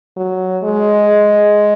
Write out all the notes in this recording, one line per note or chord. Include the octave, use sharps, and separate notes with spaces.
F#3
G#3